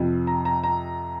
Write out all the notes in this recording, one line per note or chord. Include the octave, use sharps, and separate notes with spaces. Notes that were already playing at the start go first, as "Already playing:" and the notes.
Already playing: F2 C3 F3
A#5
A#5
A#5